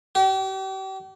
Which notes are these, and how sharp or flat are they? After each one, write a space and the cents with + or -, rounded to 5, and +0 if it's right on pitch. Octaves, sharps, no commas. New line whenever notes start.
G4 -40